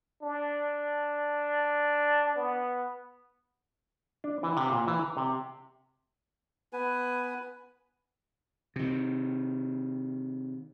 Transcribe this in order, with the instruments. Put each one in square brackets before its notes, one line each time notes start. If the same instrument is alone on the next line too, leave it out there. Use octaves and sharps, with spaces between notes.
[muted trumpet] D4
B3
[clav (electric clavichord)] D4
E3
C3
A#2
E3
A#5
C3
[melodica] B3 B4 G#5
[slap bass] C3 D#3